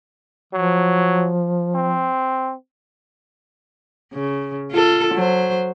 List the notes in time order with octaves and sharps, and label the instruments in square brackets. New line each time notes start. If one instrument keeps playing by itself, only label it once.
[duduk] F3 [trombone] F#3
[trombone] C4
[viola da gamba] C#3
F4 A4
F#3 C5